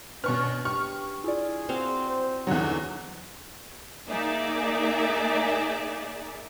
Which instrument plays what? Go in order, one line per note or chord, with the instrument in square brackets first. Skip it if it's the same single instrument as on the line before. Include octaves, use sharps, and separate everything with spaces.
[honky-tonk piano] B2 C#6 F6 [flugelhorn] C#4 [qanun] D4 [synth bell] B4
[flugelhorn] G4 [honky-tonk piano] C#6 F6
[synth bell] E4 F4 D5 [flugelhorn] G#4
[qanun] C4 F#4 F5
[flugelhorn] C5
[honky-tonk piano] E2 F#3 [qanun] D3 D#4 C#5 [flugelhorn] F#5
[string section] A#3 D#4 G#4 D5 E5